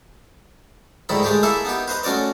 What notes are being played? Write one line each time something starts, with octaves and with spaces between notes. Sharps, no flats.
D2 G#2 D#3 E4 B5
G#3 A3 G4 G#4
A#3 E4 G#4 A4 E5
B3 D#4 G4
B4 C5 D#5 A#5
A3 C#4 F#4 D5 D#5